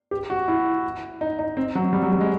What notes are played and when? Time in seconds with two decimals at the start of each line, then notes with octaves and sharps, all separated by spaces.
0.11 G4
0.30 F#4
0.48 E4
1.21 D#4
1.39 D#4
1.57 C4
1.75 F#3
1.93 G3
2.03 F#3
2.12 G3
2.21 G#3